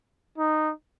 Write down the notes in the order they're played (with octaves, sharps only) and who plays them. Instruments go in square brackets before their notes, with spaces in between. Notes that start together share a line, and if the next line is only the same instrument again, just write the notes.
[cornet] D#4